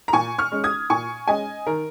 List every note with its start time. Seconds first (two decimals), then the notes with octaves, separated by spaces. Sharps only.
0.08 A#5
0.13 A#2 G#5 C#6
0.38 C#6 F6
0.52 G#3 C#4
0.64 D#6 G#6
0.90 A#2 G#5 C#6
1.27 G#3 C#4 D#5 G#5
1.67 D#3 A#4